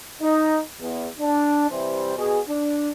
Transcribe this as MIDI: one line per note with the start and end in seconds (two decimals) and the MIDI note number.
0.22 0.59 63
0.81 1.08 40
1.19 1.66 62
1.70 2.15 48
1.70 2.15 52
1.70 2.15 55
1.70 2.15 72
2.17 2.39 47
2.17 2.39 66
2.17 2.39 68
2.48 2.90 62